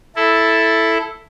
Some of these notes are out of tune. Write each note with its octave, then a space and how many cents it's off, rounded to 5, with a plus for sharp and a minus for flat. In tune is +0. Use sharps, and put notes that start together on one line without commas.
E4 +0 A4 +0